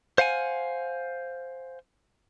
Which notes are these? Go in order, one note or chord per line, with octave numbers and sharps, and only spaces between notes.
C5 F5 F#5 G#5